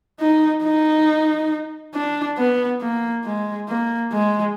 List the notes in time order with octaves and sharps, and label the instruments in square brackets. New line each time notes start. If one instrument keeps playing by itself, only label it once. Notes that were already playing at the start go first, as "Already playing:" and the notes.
[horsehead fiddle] D#4
D#4
D4
B3
A#3
G#3
A#3
G#3